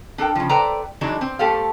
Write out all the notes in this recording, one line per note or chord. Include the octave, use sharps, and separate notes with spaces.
D4 A4 A#4 G5
C#3 F3
A4 B4 C5 D5 G5 A#5
E3 F#3 G#3 D4 D#4
C4
A3 G4 A4 C5 F5